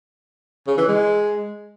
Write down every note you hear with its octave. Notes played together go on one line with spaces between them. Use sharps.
C#3
E3
G#3